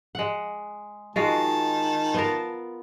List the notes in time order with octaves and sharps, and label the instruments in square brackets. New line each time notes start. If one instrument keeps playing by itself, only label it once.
[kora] G#3 F#5
[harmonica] D#3 A5 [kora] G#3 F4 F#4
[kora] B3 F4 A#4